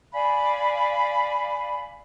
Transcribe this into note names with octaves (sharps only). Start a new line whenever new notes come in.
D5 F5 G#5 B5